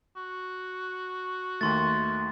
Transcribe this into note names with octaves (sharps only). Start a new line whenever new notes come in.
F#4
D#2 D#3 A3 C6 A6